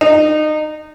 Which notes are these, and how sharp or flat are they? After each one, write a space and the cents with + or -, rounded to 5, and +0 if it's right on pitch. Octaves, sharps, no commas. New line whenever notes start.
D#4 -25